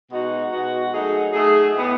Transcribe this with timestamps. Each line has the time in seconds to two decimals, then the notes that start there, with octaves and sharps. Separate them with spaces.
0.11 B2 G#3 D#4 F#4
0.52 B2 G#3 D#4 F#4
0.93 F#3 A3 D#4 G#4
1.33 F#3 A3 D#4 G#4
1.75 A2 G#3 B3